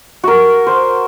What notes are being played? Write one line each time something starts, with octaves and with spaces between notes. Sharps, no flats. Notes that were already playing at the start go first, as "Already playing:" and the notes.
F#4 A#4
C5